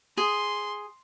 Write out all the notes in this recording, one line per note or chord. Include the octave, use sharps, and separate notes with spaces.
G#4 C6